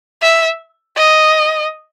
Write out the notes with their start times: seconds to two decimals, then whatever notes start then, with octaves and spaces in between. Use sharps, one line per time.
0.22 E5
0.97 D#5